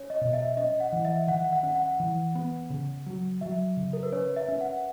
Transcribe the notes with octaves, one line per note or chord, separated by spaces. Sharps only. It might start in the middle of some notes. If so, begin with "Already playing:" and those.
Already playing: C#4 C#5
D#5
B2
E5
C#4 D#5
F#5
E3
E5
D#3 F#5
F#5
C#4
F#5
E3
B3
C#3
F#3
F#3 E5
C#3
A#4
B4
C#4 C#5
E5
C#4
F#5